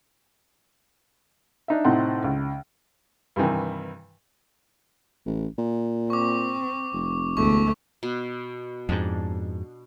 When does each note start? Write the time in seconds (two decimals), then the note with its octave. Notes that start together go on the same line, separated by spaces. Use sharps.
1.68 D4 D#4 E5
1.85 A2 C3 C4 D#4 F#5 C6
2.24 C#2
3.36 G2 C3 D#3 E3
5.26 A1
5.58 A#2
6.10 C4 C#6 D6
6.93 F1
7.37 E1 D2 A3 C#6
8.03 B2
8.89 F2 G#2 D4